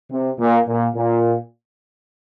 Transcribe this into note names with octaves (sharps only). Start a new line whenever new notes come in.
C3
A#2
A#2
A#2